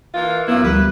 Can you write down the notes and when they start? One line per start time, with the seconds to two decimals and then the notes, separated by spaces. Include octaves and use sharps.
0.15 E3 A#3 F4
0.48 F#2 A#3 B3 E4
0.64 D2 F3 G3 B4